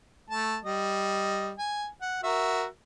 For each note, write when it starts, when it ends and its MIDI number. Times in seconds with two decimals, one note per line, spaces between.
0.30 0.57 57
0.30 0.57 81
0.64 1.52 55
0.64 1.52 75
1.59 1.87 80
2.02 2.23 78
2.23 2.65 66
2.23 2.65 70
2.23 2.65 76